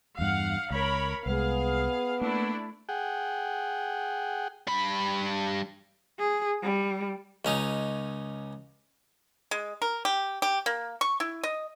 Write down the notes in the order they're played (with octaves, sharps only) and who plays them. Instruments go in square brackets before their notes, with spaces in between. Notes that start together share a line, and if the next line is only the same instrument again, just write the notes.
[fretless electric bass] E2 G2 [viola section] F5 F#5
[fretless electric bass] C#2 [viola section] A#4 C#5 B5
[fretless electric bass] C2 G#3 [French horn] B3 [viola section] G#4 F5
[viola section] A3 D4 E4 [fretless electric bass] A#3
[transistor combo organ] G#4 F#5 G5
[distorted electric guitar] G2 B5
[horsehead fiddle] G#4
G3
[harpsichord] C#2 C#4 D#4
[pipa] G#3
A#4
G4
G4
A#3
C#6
E4
D#5